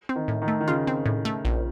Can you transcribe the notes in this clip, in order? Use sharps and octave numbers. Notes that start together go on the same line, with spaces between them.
C4
D#3
A2
D#3
A3
D#3
C#3 F4
C4
A2
A3
A#1